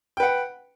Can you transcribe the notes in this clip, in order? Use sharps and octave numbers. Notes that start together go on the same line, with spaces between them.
B4 F#5 G5